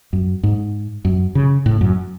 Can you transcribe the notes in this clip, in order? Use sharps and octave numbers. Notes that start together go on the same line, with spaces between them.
F#2
G#2
F#2
C#3
A2
F#2